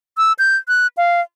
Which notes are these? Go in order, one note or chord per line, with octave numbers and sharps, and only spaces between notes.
E6
G6
F#6
F5